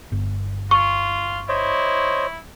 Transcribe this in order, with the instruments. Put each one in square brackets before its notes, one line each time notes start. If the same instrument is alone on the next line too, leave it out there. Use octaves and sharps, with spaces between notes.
[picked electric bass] G1
[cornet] F4 [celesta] C#6
[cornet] E4 [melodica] C5 C#5 D#5